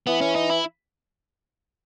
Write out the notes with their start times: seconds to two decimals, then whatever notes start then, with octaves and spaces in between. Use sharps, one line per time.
0.07 E3 B3
0.21 C#4
0.36 D#4
0.50 E4